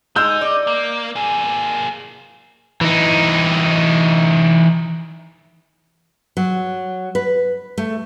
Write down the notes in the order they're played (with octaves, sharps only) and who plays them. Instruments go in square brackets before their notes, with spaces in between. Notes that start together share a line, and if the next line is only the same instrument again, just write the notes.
[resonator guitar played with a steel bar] G#3 [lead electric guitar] D#4 [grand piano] E6 G6
[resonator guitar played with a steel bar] D5
[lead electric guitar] A#3
A#3 G#4
[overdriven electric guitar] E3 D#4
[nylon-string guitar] F#3
B4
A3